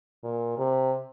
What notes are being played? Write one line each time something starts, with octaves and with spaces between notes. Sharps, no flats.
A#2
C3